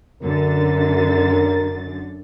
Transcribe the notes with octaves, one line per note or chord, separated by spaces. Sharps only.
F#2 D3 A#4 A6